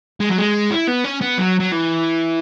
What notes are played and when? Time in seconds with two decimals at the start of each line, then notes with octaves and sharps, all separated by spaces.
0.20 G#3
0.30 F#3
0.39 G#3
0.71 E4
0.88 B3
1.05 C#4
1.21 B3
1.39 F#3
1.60 F#3
1.72 E3